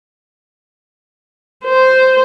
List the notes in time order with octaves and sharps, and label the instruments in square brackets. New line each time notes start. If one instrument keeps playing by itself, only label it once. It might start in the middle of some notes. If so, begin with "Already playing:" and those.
[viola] C5